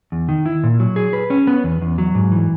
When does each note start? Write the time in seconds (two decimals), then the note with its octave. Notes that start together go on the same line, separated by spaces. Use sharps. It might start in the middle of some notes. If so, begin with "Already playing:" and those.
0.12 E2
0.29 D#3
0.46 E4
0.64 A#2
0.80 F#3
0.96 G#4
1.13 B4
1.30 C#4
1.47 B3
1.64 E2
1.82 E2
1.98 F#3
2.15 G#2
2.32 E3